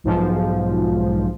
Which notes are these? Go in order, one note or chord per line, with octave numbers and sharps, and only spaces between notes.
B1 G#2 F3